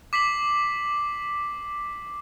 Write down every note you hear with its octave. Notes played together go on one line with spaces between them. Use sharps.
D6 B6 C7 F#7